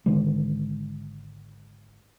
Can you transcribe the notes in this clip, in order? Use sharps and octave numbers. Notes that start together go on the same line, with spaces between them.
G#1 D3 D#3 G#3